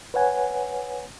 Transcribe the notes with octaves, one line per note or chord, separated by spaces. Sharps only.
B4 C#5 F#5 G#5